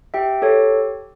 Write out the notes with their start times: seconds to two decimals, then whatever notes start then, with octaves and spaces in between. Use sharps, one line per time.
0.14 G4 E5 G5
0.42 G4 A4 C#5